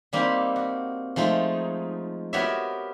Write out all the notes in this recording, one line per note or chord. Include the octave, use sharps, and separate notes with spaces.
G3 A#3 C4 D#4 G4
F#4
F3 G#3 A3 D#4
B3 F#4 G4 A#4 C#5 E5